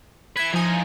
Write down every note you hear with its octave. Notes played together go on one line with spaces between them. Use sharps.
B4 E5 G#6
E3 F3 D#4 G#5